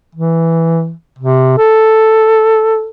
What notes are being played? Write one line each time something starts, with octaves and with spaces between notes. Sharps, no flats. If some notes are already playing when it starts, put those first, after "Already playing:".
E3
C3
A4